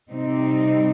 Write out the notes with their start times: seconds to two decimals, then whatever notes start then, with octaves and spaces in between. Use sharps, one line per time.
0.11 C3 G3 C4 D#4